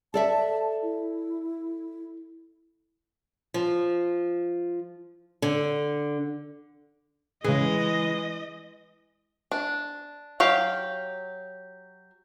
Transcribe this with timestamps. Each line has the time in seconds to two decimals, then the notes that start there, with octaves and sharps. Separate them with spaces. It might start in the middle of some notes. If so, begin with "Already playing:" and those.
0.14 A4 D5 E5 A5
0.82 E4
3.54 F3
5.42 D3
7.44 C#3 E3 G#3 G#4 D#5
9.52 D4
10.40 F#3 G4 F5